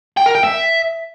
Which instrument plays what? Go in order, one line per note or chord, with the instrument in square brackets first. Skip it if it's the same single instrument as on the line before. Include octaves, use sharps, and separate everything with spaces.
[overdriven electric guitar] G5
A#4
G5
E5